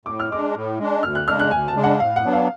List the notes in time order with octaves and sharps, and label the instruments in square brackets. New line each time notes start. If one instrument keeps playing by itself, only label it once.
[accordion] A2 [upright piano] D6
[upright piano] F6
[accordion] G#3 D4 [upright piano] D6
[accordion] A2
G#3 D4
[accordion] D2 [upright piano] F6
[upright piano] F#6
[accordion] C#3 G#3 D4 [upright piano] F6
[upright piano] F#6
[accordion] D2 [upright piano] G#5
[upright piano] A5
[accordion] C#3 G#3 D4
[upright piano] F#5
[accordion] A2 [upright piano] F5
[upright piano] F#5
[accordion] F#3 B3 D4
[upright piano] F5